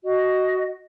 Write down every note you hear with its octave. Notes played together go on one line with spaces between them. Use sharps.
F#4 D#5